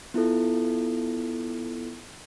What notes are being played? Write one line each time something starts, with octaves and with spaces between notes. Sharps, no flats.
B3 E4 F4 A4